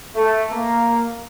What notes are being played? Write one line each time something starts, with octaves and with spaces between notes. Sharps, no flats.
A3
A#3